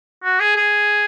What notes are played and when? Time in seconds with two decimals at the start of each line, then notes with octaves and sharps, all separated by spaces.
0.24 F#4
0.40 G#4
0.56 G#4